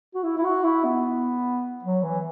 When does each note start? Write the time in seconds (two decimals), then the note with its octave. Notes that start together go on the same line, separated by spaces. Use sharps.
0.14 F#4
0.23 E4
0.37 E4
0.44 F#4
0.64 E4
0.84 B3
1.83 F#3
2.03 E3